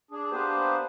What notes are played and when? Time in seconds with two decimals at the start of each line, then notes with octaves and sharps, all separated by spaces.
0.11 D4 G#4
0.31 A#3 B3 D4 G4 B4 C5